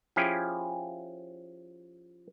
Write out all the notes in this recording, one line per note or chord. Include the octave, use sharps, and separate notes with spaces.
F3 C#4 E4 G4 G#4